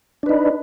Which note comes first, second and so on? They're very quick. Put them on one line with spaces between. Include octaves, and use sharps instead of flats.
D4 B4 D#4